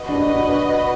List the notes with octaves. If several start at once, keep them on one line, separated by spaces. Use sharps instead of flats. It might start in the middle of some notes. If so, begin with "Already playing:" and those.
Already playing: F#4 B4 D#5
D4
D4
D4